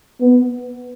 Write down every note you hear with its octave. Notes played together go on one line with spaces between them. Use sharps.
B3